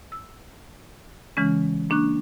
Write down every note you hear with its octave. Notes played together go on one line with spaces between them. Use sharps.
E6
C#3 E3 G#3 C#4
A#3 D4 C#6 F#6